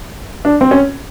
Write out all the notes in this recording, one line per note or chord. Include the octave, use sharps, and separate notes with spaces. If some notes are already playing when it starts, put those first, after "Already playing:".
D4
C4
C#4